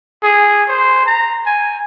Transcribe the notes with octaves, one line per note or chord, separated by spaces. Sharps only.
G#4
C5
A#5
G#5